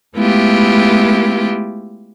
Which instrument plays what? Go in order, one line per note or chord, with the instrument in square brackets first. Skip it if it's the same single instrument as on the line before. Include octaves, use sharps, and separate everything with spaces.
[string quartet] G#3 A3 B3 E4 F4 G4